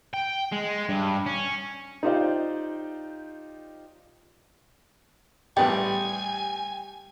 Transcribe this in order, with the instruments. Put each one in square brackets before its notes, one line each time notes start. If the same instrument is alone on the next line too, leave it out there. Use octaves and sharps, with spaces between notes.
[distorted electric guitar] G5
G#3
G2
C#4
[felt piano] D#4 F4 G4 C5 D5 F5
[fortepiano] A1 B3 D5 [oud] G3 [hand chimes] G5 [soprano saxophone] G#5